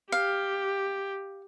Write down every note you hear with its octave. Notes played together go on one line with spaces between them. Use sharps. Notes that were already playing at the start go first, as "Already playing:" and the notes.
G4 F5